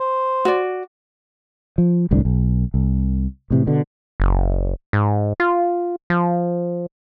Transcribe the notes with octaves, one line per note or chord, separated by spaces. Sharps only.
C5
F#4 D5
F3
G1 C2 A2 D4
B1
C2
A2 C3 E3
B2 D3
F#1
G#2
F4
F3